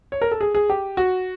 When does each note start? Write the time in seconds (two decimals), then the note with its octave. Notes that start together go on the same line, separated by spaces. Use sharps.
0.12 C#5
0.21 A#4
0.31 A4
0.41 G#4
0.55 G#4
0.70 G4
0.97 F#4